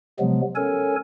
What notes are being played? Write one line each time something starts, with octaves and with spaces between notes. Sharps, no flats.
C3 F3 F#3 G#3 B3
C#4 A4 A#4 C#5 G#5